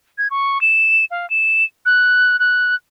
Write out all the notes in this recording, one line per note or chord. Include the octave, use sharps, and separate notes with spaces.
G#6
C#6
E7
F5
E7
F#6
F#6